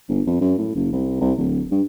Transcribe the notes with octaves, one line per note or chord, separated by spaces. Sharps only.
G1
F2
F#2
A2
F#1
C2
C2
D1
G2